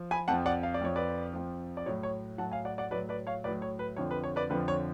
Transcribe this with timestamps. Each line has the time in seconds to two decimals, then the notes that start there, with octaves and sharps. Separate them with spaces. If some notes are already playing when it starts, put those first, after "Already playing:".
Already playing: F3
0.11 G#5 B5
0.28 F2 F3 F#5 A5
0.46 D5 F#5
0.63 F5
0.74 D5
0.81 F2 F3 C#5
0.96 B4 D5
1.33 F2 F3
1.77 D5
1.86 A2 F#3 C#5
2.03 C#5
2.38 F#3 F#5 A5
2.43 A2
2.52 F5 G#5
2.65 D5 F#5
2.78 D5 F#5
2.91 F#3 B4 D5
2.96 A2
3.09 B4 D5
3.27 C#5 F5
3.44 A2 B4 D5
3.48 F#3
3.62 C#5
3.79 B4
3.96 F2 D3 F3 C#5
4.11 B4
4.24 C#5
4.36 B4 D5
4.50 F2 D3 F3 B4
4.68 C#5